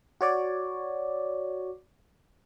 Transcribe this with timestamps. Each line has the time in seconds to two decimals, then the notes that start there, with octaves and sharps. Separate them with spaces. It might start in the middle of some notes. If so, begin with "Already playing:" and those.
0.21 F#4 C#5 D5